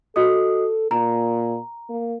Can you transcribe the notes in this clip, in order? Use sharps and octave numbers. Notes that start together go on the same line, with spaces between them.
F#4 A4 D#5 D#6
A#2 A#5
A#3